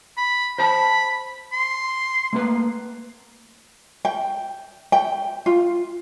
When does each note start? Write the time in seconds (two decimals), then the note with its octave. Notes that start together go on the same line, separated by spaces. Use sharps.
0.18 B5
0.59 C5 A5 B5
1.53 C6
2.33 A3 A#3 B4
4.05 G5
4.92 G5
5.46 F4